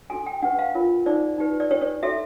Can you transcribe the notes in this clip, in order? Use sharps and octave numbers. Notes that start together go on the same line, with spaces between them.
D4 F#4 A4 G#5
G5
D4 G4 B4 F#5
F5
D4 F4 A#4 C#5
D#4 G#4 C5 D5
D#4 G4 B4
D5
D4 G4 B4 C#5
C#5
F#4 A4 C#5 E5